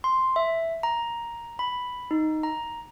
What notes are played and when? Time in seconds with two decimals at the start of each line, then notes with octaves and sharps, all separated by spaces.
0.04 C6
0.36 E5
0.83 A#5
1.59 B5
2.11 D#4
2.43 A#5